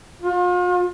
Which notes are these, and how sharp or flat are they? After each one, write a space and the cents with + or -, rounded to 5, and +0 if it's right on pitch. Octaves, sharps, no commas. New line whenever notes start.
F4 +40